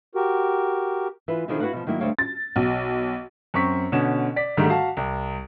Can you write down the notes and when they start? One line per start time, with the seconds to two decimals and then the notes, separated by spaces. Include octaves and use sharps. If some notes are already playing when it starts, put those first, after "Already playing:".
0.15 F#4 G4 A#4
1.28 E3 F4 B4
1.48 B2 D3 D#3 F3 E4 G#4
1.60 E4 F#4 G4 B4 F5 F#5
1.73 B2 F3
1.87 D#3 F#3 A#3 E4
2.00 D2 G3 C5 C#5 F5 G5
2.19 A6
2.56 B1
3.54 F#2 C4 C#6 B6
3.92 B2 D3 C#4 E7
4.36 D5 B6
4.57 G#2 D3 D#3 G3 A3
4.69 F#4 F5 A5
4.97 C2